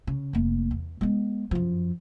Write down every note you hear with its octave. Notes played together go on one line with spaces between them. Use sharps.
C#3
F1 A#3
E2
G#3 B3
F#2 F3